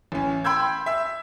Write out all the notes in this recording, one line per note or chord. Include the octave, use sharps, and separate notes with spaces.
A1 C#4
G5 B5 C6 E6 G6 G#6
E5 E6